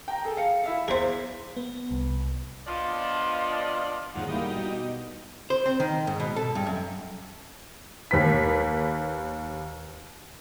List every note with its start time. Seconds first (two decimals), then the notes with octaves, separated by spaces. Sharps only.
0.08 G5 A#5
0.25 G#4 A4
0.37 F5 C#7
0.64 E4 E5 F5
0.88 E2 G#4 C5 B6
1.56 B3
1.91 C2
2.67 F3 B3 D4 F4 D5 D#5
4.15 D#2 G#2 C#3 F3 F#5
4.28 G3 A#3 D#4 E4
4.41 B2
5.50 C5
5.66 C4
5.80 D#3
6.07 G#2
6.20 B2
6.36 A4
6.55 G2
6.67 F#2
8.11 D#2 B4 B6